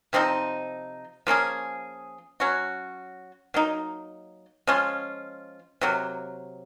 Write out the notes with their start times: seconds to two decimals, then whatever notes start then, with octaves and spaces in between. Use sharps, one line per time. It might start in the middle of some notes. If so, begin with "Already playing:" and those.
0.13 C3 F3 C4 D#4
1.27 F3 A#3 C#4 G#4
2.40 F#3 C#4 F#4
3.54 F#3 A#3 D#4
4.67 F3 G#3 C#4 F4
5.81 C3 F#3 A#3